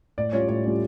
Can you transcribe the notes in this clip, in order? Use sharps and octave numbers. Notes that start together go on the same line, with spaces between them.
A2 D5
G3 C#4 F4 C#5
A2 C#5
G3 C#4 F4